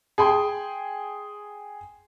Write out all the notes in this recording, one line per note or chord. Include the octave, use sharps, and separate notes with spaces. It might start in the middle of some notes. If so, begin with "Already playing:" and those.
G#4 G5 G#5 C6